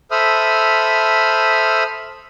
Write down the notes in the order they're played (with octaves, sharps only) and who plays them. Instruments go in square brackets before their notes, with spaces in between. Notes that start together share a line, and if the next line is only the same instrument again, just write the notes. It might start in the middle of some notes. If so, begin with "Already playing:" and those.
[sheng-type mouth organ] A4 C5 E5 B5 D#6 F6